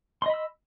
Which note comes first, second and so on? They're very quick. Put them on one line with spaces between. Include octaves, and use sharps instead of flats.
C6 D#5 B5 E6